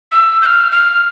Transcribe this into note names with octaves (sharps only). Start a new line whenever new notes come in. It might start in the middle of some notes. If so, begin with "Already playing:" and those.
E6
G6
F6
F6